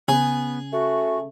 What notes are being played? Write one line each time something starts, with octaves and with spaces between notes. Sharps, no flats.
C#3 B3 G#4
A3 F#4